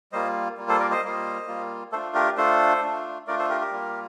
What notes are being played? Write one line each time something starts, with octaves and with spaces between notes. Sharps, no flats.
G3 A#3 F4 C5 D#5
G3 A#3 F4
A4 C5
A#4 D5
C5 D#5
G3 A#3 F4
G3 A#3 F4
A3 D4 F4 A4 C5
G4 A#4
A3 D4 F4 A4 C5
A3 D4 F4
A3 D4 F4 A#4 D5
A4 C5
G4 A#4
G4 A#4
G3 A#3 F4